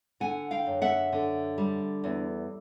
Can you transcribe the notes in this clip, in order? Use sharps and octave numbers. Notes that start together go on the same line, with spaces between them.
D3 F#5 G#5
F5 G5
F#2
E5 F#5
D3
G3
E2